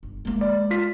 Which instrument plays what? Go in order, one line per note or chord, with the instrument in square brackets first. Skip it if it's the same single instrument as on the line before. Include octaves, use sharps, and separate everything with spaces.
[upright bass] G1
G#3 A#3
[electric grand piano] D5
F4 B6